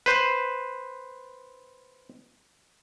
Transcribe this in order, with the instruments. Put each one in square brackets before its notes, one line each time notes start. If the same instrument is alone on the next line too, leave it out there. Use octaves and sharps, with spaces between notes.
[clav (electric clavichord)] B4 C5